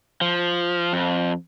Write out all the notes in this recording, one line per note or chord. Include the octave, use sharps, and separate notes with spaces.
F3
F2